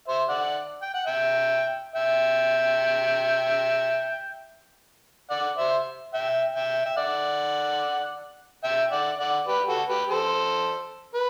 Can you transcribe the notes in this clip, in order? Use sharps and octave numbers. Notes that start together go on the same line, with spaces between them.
C5 E5
D5 F#5
G5
F#5
E5 G5
E5 G5
D5 F#5
C5 E5
E5 G5
E5 G5
E5
D5 F#5
E5 G5
D5 F#5
D5 F#5
G4 B4
F#4 A4
G4 B4
A4 C5
B4